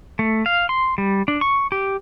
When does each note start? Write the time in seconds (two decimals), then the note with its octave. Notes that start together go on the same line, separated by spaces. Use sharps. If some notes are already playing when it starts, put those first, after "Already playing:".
0.19 A3
0.46 F5
0.69 C6
0.98 G3
1.28 D4
1.41 C#6
1.72 G4